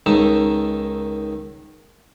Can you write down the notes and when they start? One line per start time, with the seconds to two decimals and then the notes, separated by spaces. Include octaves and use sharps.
0.06 C#2 D#3 D#4 E5 A5